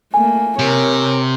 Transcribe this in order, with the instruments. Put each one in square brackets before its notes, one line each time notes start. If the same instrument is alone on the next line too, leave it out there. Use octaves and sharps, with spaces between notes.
[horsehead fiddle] A3 A#3 [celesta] G#5
[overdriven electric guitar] C3 [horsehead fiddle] A#4 C#5